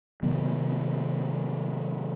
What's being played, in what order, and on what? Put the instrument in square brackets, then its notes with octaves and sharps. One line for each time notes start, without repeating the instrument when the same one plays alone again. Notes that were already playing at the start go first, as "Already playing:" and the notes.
[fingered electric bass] C3 D#3 F#3 B3